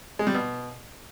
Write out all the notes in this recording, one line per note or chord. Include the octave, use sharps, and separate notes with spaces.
G#3
G3
B2